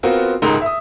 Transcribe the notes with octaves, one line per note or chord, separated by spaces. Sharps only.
B3 C4 F4 F#4 A#4
D#1 C#2 G#2 D#4 A#4 C6
E5 D#6